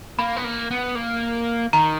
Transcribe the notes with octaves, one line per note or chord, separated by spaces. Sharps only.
A#3 B5
B3
A#3
B3
A#3
D#3 A#5